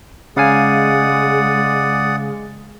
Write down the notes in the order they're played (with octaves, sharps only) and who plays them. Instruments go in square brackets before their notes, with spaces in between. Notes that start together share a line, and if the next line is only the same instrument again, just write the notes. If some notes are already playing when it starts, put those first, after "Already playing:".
[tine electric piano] C#3 F5 G#5 [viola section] G#3 [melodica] D5 F#5 D#6